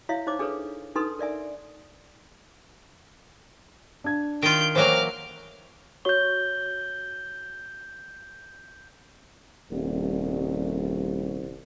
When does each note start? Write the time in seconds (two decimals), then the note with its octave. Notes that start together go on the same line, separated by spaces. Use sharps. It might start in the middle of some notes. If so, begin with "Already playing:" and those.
0.09 E4 C#5 E5 F5
0.27 D#4 C5 C#5 D6
0.39 D4 G#4 A4 B4 C#5
0.95 D4 D#4 A4 B4 C6 D#6
1.19 A#4 D5 E5 G#5
4.04 D4 G#6
4.42 D#3 F4 G6 D7
4.76 E3 F#3 A#3 C5 C#5 G5 D6 F6
6.05 F#4 C#5 C#6 G6 G7
9.71 D#1 C2